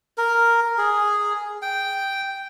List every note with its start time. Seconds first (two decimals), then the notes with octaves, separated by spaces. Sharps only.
0.18 A#4
0.78 G#4
1.62 G5